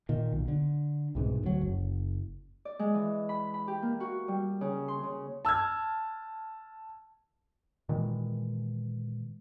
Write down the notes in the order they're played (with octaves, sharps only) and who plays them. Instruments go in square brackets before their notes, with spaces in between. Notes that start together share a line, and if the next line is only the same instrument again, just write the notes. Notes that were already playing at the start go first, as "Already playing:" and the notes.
[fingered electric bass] A#2 D#3
B1
D3
C2 G#2 B2
D2 F#3
F#1
[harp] D5
G#3
E3
B5
B5
G4
A#3
F#4
G3
C#3
C6
C#3
[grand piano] A5 E6 F6 G#6
[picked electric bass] A#2 D#3 E3 G#3